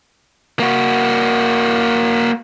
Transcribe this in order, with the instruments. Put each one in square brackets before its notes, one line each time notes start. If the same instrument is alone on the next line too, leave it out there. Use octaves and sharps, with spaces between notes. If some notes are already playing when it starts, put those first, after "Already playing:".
[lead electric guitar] A#3 F#4